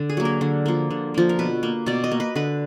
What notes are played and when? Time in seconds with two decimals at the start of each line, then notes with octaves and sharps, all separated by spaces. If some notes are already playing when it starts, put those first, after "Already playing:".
Already playing: D3 D5
0.10 G#4
0.17 F#3 A#3
0.25 A#4
0.41 D3
0.66 F3 A#3
0.91 D3
1.14 F3 A#3
1.29 A#4
1.39 B2 B4
1.63 A#3
1.86 B2 D5
2.04 D#5
2.11 A#3
2.20 B4
2.35 D3 B4